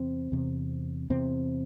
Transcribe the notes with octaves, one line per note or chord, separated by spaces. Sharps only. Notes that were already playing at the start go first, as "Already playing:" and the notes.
Already playing: E2 C3 C4
E2 C3
E2 C3 C4